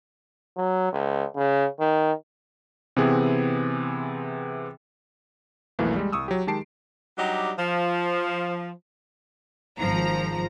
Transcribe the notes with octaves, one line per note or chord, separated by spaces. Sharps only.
F#3
C#2
C#3
D#3
C3 E3 B3 C4 G#4
B1 F2 B2 E3 A3 A#3
G3 G#3
C2 C#6 D#6 E6
F#3 G4
D#3 G#3 G4 A5 C7 D7
F#3 G3 D4 D#4 G4
F3
G#1 F3 A#5